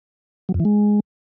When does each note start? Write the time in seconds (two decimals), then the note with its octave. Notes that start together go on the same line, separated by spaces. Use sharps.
0.49 F#3
0.54 F2
0.60 E3
0.65 G#3